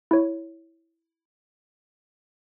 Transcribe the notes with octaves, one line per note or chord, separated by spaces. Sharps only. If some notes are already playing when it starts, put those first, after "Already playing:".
E4 C#5